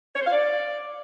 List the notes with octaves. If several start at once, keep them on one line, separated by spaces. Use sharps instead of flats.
C#5
C5
F5
D5